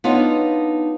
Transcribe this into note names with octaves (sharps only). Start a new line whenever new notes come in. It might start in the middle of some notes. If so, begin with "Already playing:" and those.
B3 D4 D#4 F4 B4 C#5